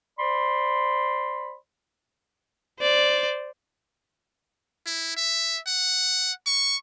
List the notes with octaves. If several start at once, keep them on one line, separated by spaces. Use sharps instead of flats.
C5 D5 B5 C6
C5 D5
E4
E5
F#5
C#6